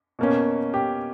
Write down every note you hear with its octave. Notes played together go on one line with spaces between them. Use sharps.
B2 A#3 C#4
G4